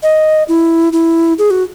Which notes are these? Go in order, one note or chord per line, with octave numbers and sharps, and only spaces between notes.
D#5
E4
E4
G#4
F#4